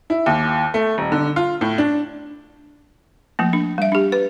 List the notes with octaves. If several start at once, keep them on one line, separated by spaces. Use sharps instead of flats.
E4
D#2
A3
D#1
D3
F4
A2
D4
F3 A3 A#3
D4
G3 E5
D4 G4
B4